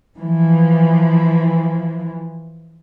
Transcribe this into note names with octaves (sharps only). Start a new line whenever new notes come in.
E3 F3